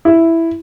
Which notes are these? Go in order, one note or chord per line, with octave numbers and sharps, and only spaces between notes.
E4